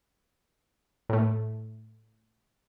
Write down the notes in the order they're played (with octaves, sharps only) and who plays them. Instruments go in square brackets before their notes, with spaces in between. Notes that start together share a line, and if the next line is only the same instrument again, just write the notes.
[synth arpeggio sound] A2 A3